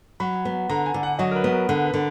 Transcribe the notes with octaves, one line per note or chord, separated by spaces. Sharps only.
F#3 B5
B3
D3 A#5
G#5
D3
F#5
F#3 D#5
A#4
B4
B3
A#4
D3 B4
B4
D3